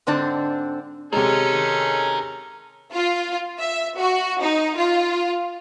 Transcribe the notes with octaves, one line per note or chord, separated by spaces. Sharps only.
G#2 D3 C4 D4
C3 G#3 C#4 D#4 A4 A#4
F4
E5
F#4
D#4
F4